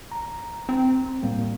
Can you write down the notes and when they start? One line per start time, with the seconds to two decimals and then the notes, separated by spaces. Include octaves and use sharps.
0.12 A#5
0.69 C4
1.23 A2 G3 A#3